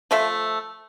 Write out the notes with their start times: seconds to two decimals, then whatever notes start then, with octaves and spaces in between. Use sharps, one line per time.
0.11 F3 A3 E5